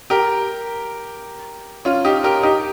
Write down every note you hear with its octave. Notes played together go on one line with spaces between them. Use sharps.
G4 A#4
C#4 F4
D#4 G4
G4 A#4
D#4 G4